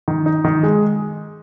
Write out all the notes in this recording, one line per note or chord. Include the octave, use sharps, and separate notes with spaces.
D#3
D#4
D#3
G#3